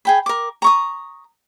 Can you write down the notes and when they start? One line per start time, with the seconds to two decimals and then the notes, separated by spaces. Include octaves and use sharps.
0.05 G#4 G5 B5
0.26 A#4 D6
0.62 A#5 C#6 D#6